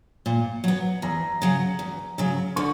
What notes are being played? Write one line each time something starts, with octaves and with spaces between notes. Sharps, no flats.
A#2
F#3 B3
E2 A#5
C#3 F#3
E2
C#3 F#3
D3 C#6